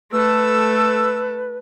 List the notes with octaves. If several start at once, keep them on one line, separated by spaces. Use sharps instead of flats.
A3 A4 B4 E6